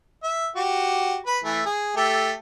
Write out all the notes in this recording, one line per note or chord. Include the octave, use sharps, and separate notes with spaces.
E5
F#4 G4
B4 B5
E3 A3
G#4
A3 G4 A4